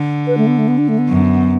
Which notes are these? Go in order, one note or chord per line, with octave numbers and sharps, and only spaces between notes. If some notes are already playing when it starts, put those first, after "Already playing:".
Already playing: D3
B4
A3
B3
A3
B3
D4
A3
B3
F#2